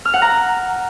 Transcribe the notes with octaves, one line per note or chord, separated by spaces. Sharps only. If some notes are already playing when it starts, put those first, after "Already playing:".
F6
F#5
A#5